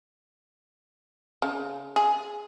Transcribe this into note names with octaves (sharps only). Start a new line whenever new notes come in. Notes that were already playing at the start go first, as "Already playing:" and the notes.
C#3
G#4